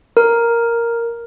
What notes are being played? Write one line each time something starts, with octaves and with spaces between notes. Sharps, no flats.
A#4